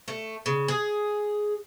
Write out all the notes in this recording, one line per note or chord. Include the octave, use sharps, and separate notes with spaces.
A3
C#3
G#4